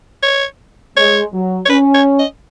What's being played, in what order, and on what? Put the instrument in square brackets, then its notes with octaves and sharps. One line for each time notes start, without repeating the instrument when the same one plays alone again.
[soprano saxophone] C#5
[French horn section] G#3 [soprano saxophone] C#5
[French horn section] F#3
[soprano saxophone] C#5
[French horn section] C#4 [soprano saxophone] B4
[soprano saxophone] C#5
D#5